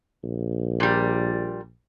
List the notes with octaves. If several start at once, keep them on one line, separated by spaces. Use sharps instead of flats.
A#1
A#2 G3